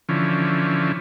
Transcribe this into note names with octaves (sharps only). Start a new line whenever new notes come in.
D3 E3 F3 C#4